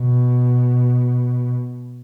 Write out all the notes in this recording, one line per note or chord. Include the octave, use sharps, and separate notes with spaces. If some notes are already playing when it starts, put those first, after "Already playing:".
Already playing: B2